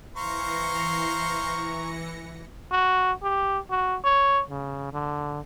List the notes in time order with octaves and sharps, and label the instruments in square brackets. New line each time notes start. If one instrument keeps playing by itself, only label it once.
[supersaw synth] E3 A#6 C#7 [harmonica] C5 F5 C6 [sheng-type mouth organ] A#5 C#6
[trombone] F#4
G4
F#4
C#5
C#3
D3